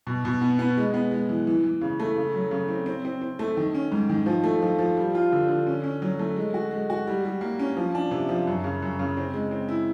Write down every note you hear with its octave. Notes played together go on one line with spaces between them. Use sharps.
B2
B2
B3
B3
G#3
B3
G#3
E3
E3
E3
C#3
A3
C#3
F#3
C#3
C4
C4
C4
C4
A3
D#3
C#4
G#2
D#3
F3
A3
F3
F3
G3
F4
D3
D3
C#4
C#4
F#3
A3
G#3
F#4
G#3
F#4
G3
G3
A#3
C#4
F3
D4
C3
F3
F#2
C#3
F#2
C#3
C4
G#3
C4
E4